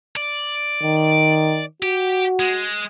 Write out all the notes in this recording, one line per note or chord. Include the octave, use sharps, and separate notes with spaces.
D5
D#3
F#4 G4
G#3